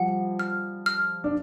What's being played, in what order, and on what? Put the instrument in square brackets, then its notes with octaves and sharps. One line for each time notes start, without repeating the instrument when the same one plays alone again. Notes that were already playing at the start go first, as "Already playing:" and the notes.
Already playing: [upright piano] F3 G3 [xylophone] F#5
[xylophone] F6
F6
[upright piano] D4